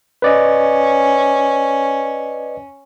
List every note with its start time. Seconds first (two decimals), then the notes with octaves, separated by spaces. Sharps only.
0.22 C#4 B4 D5 D#5